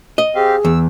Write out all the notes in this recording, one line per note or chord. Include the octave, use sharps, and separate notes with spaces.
D#5
C4 G4 G#4 F5
E2 E6